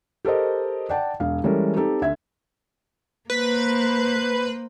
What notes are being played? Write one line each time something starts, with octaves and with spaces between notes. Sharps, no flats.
G4 A4 A#4 C5 D#5
D5 F#5 G5 A5
E1 F5
E3 G3 G#3 C#4 A4 A#4
C4 D#4 G4 A4
D2 E5 G#6
A#3 B4 C5